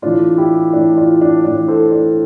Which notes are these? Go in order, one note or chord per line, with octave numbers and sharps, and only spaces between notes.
A2 E3 D4 F4
E4 G4
A2 E3 D4
D4 F4
D4
A2 E3 D4
A4 C5
D4